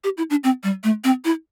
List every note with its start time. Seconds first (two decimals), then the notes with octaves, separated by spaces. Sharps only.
0.04 G4
0.17 E4
0.30 D4
0.44 C4
0.63 G3
0.84 A3
1.04 C4
1.25 E4